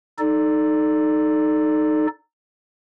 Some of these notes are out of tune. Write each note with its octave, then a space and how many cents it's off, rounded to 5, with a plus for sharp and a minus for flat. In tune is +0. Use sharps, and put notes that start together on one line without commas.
D#4 -10 A4 +0 D5 +0